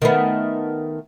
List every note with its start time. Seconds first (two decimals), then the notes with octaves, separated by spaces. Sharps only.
0.02 D#3 A3 B3